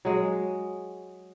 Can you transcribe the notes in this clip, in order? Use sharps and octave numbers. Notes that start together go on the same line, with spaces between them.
F#3 G#3